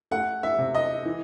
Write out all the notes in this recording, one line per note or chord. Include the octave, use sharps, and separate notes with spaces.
A3 F#5
E5
C3
D#5
E3